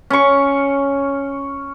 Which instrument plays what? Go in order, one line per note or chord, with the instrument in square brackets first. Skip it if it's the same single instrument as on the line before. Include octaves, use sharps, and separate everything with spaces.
[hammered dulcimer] C#4 C#6